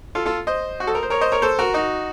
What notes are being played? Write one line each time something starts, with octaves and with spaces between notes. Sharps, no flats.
F4 A4
F4 A4
C5 D#5
F#4
A4
A#4
C5
A#4 C#5
C5 D#5
A#4 C#5
A4 C5
F#4 A#4
D#4 F#4